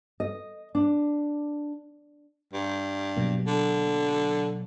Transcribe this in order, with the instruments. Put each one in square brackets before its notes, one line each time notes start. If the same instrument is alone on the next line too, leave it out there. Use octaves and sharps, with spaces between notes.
[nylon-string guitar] D#5
D4
[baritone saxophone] G2
[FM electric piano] B2 F#3 A#3
[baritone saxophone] D3